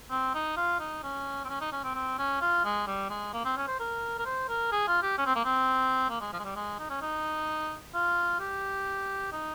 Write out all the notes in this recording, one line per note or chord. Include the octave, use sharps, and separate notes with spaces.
C4
D#4
F4
D#4
C#4
C4
C#4
D#4
C#4
C4
C4
C#4
F4
G#3
G3
G#3
A#3
C4
C#4
C5
A#4
A#4
C5
A#4
G#4
F4
G4
C#4
C4
A#3
C4
A#3
G#3
F3
G#3
G3
G#3
D#4
C#4
D#4
F4
G4
D#4